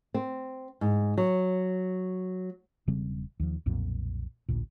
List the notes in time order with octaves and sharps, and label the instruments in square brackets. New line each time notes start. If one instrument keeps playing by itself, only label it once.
[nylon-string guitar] C4
G#2
F#3
[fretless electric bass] E1 C#3 G3 C4
D#2 F3
B1 F2 A#2
A1 D2 A#2